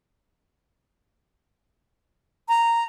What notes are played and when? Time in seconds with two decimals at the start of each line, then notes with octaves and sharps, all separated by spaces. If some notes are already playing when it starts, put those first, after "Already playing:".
2.49 A#5